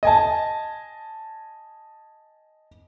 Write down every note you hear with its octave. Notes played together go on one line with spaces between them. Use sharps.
D#5 G#5 A5